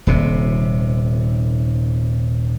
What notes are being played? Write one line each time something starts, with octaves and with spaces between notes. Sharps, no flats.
D#1 C3